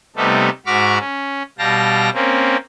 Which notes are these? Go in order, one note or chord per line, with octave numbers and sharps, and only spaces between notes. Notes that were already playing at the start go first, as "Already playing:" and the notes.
C3 G3 A3 B3 D#4 A4
G#2 F#4 B5 C#6 D6 F6
C#4
B2 G3 F5 G5 A5 A#6
A#3 C4 C#4